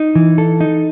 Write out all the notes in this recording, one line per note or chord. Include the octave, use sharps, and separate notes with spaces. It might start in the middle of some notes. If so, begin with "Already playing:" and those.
Already playing: D#4
E3
A4
D#4